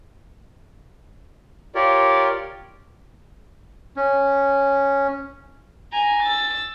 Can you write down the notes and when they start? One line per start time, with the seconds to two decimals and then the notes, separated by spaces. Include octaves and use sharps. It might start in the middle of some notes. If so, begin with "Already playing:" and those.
1.75 F4 G4 A#4 C#5 D5
3.96 C#4
5.93 G#5 A#5
6.23 E6 A6